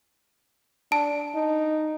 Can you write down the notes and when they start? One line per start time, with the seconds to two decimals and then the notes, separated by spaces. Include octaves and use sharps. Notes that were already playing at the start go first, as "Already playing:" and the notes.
0.92 D4 A5
1.35 D#4